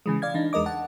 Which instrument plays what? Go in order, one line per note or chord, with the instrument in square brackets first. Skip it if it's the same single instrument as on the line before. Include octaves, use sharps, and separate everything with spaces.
[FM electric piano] C#3 E3 G#3
D5 F5 G#6
E3 D4 D#4
E2 G#3 A#4 D#5 D6
F#5 A5